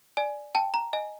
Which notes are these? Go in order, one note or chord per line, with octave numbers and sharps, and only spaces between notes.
D5 G#5
G5 A5
A#5
D#5 G#5